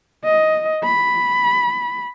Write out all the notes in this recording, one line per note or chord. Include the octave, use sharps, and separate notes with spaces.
D#5
B5